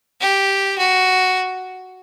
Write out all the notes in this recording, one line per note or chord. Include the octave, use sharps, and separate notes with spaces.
G4
F#4